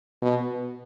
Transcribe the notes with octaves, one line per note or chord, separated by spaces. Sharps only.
B2